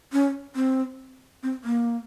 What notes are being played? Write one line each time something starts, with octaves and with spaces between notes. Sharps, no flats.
C#4
C4
C4
A#3